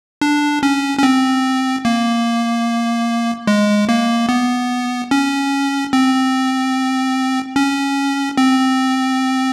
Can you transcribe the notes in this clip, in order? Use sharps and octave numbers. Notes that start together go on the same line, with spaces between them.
D4
C#4
C#4
C4
A#3
G#3
A#3
B3
C#4
C4
C#4
C4